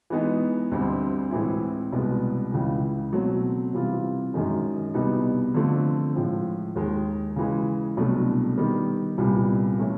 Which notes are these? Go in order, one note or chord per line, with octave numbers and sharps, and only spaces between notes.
E3 G#3 B3 D#4 G#4
D2 D3 G3 C4
A2 E3 G#3 C4 E4
C2 B2 G#3 B3
C#2 C#3 E3
B2 F#3 A3 C4
C3 E3 G3 C4 F4
F#2 D#3 G#3
C2 B2 G3 B3 D#4
D3 F3 A3 C4
A2 F3 G#3
D#2 D#3 G#3
C#3 E3 G#3
C2 B2 F#3 A3 D4
D#3 G3 B3
C2 A#2 G3 B3
E3 A3 C#4 E4